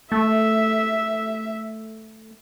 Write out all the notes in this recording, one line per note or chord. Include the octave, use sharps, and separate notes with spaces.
A3 E5